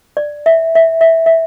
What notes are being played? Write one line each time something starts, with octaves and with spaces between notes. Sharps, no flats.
D5
E5
E5
E5
E5